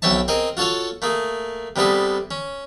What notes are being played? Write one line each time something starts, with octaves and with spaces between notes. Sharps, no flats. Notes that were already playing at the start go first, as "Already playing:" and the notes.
B1 C4 C#5 E5 A5
C4 G#4 A#4 D#5
F4 F#4 A4 C#5 F5
A3 A#3 G#4
C3 G3 B3 G#4 A4
C#4